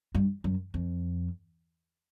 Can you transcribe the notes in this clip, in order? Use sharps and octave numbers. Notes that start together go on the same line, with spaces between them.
G2
F#2
F2